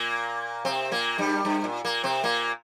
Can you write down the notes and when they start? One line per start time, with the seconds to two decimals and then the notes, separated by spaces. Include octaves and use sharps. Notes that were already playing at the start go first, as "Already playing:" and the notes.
Already playing: A#2 A#3
0.65 C3 C4
0.91 A#2 A#3
1.18 G2 G3
1.45 G2
1.64 A#2
1.84 A#2 A#3
2.03 C3 C4
2.24 A#2 A#3